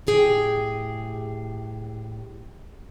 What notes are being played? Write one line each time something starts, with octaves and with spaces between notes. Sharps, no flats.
A2 G4 G#4 G5